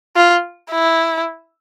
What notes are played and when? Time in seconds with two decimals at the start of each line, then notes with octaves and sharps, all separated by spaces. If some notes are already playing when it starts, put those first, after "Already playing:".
0.16 F4
0.71 E4